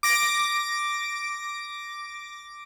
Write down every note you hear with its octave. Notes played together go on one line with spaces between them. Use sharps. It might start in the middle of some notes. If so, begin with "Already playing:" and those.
D6 A#6 D7